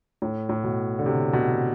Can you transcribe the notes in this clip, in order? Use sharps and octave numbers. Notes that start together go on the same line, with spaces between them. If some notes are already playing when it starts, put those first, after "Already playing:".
A2
A2
B2
D3
C3
B2